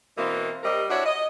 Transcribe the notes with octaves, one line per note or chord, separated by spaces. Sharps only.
B2 E3 A#3 C4
C3 G3 A#4 D#5
D4 E4 F#4 C#5
D#5